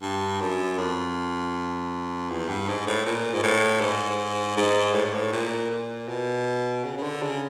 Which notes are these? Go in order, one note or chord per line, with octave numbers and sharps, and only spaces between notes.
G2
F#2
F2
E2
G2
G#2
A2
A#2
G#2
A2
G#2
G#2
A2
G#2
A2
A#2
A#2
B2
C#3
C#3
D3
C#3